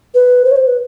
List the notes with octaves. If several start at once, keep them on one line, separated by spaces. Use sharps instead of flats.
B4
C5
C#5
C5
B4